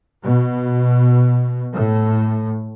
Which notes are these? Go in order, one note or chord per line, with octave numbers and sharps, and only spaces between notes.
B2
A2